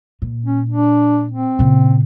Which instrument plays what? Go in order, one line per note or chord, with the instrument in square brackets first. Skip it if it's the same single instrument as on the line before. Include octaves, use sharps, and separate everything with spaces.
[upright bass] A#2
[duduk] C#4
D4
C4
[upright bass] A#2 C#3